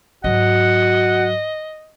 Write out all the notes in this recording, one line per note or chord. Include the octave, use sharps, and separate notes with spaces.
G#2 F#3 F#4 D#5 F#5